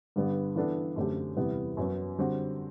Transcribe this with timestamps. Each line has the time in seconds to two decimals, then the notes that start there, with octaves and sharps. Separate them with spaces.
0.16 G2 D3 G3 B3
0.56 E3 B3 D4 A4
0.96 F#2 D3 A3 C4 G4
1.36 E2 C3 E3 G3 B3
1.77 F#2 F#3 B3
2.18 D3 G3 C4 F#4